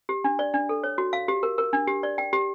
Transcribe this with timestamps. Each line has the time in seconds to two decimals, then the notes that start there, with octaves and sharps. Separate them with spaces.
0.09 G4
0.24 D4
0.39 D5
0.54 D4
0.69 A4
0.84 C#5
0.98 F#4
1.13 F5
1.28 G4
1.43 A#4
1.58 A#4
1.73 D4
1.87 G4
2.03 D5
2.18 G5
2.33 G4